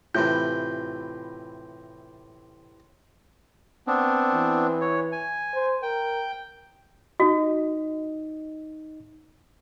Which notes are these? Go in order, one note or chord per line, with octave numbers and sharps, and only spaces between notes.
A2 C3 E3 F4 G6
B3 C4 D4
E3
C#5
G#5
C5
A#4 G5
D#4 F#4 D#5